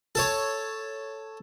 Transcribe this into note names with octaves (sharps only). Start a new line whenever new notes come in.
A4 C#5